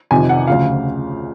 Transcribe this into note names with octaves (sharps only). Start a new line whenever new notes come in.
F2 C3 D#3 G#5
F#5
D2 C#3 F3 F5